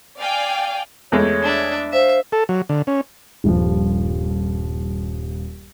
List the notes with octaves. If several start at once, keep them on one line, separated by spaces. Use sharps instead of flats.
D5 F5 G5 G#5
E2 G#3 A3 C#5
D4 E5
C5 E5 F5
A4
F#3
D3
C#4
D#1 G2 F3